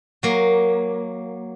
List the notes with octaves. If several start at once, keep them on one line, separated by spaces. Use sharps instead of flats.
F#3 A#3